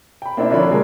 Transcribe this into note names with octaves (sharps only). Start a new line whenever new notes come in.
G5 B5
A#3 C4 D4 E4
D3 F3 D4 A#4 C#5 B5
D3 G3 G#3 G#4 A#4 C#5